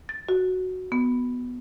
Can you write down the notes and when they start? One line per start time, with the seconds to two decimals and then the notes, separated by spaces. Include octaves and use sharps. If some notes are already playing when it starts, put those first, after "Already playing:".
0.09 A6
0.29 F#4
0.92 B3